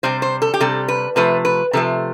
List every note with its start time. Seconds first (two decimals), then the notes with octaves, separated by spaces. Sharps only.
0.03 C3 G3 C5
0.22 C5
0.42 A4
0.54 G4
0.60 C3 G3 A4
0.88 B4
1.16 C3 F3 A3 B4
1.45 B4
1.73 C3 F3 A3 A4